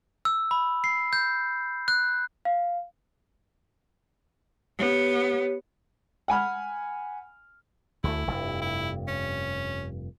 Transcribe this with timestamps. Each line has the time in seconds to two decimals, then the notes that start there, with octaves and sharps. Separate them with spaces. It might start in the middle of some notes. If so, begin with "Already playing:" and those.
0.25 E6
0.51 B5
0.84 C7
1.13 G6
1.88 F#6
2.45 F5
4.80 B3 G4 C#5
6.28 F#5 G#5 B5 F6
8.04 D2 A3 E4
8.27 F1 G2
8.61 E4
9.08 C#4